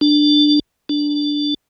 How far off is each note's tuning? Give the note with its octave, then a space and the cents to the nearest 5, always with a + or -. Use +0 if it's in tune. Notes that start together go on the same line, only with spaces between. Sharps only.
D4 +10
D4 +0